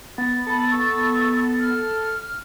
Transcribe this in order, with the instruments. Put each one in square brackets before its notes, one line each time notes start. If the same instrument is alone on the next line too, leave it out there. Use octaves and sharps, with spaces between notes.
[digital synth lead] B3 [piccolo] A6
[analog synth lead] A4 [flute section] B5
[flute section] C#6 E6
F6